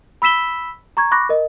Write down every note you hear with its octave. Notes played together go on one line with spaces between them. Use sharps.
B5 E6 B6 E7 G7
A#5 C#6 G#6
B5 C#6 D6 F#6 A#6
A#4 D#5